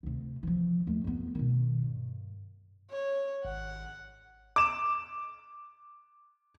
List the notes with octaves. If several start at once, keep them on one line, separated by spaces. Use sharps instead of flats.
D2 C3
E3 F3
D#2 A3
F2 B3
B2 D#3
G2
C#5
G#1 F#5
D6 E7